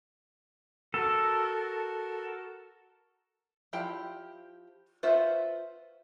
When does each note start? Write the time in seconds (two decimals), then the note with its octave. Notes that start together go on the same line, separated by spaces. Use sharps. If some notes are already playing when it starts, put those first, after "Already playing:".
0.94 F#4 A4 A#4
3.73 F3 E4 G4 G5
5.03 F4 B4 C5 E5 F#5